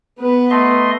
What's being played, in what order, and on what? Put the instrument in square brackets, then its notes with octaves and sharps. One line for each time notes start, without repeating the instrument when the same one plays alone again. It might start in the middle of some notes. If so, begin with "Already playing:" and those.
[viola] B3 B4
[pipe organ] A3 D#5 C6